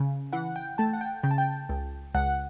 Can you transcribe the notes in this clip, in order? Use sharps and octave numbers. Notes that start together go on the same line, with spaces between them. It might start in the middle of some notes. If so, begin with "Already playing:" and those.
Already playing: C#3
E3 F#5
G5
A3 A5
F#5
G5
C#3 G5
A5
G5
C#2
C#2 F#5